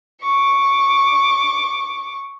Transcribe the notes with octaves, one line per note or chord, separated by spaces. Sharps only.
C#6 D6